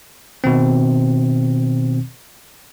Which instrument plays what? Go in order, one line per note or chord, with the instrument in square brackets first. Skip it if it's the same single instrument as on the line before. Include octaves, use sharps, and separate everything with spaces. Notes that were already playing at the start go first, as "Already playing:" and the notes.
[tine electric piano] B2 D#3 C4